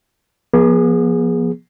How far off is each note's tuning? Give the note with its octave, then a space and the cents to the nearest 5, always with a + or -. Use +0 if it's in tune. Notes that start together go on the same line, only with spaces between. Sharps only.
F3 +0 B3 -45 G#4 -10